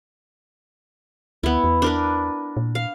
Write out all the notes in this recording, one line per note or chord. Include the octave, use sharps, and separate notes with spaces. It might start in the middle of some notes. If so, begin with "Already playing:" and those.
D2 B3 E4
E2
D4 A#4 B4
A#2
F5